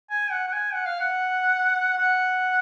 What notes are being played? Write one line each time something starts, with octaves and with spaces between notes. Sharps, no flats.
G#5
F#5
F#5
G#5
F#5
F5
F#5
F#5